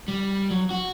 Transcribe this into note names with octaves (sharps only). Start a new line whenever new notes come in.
G3
F#3
F#4